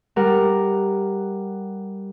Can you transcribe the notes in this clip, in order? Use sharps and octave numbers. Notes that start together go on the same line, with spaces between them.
G3 A#4 F#5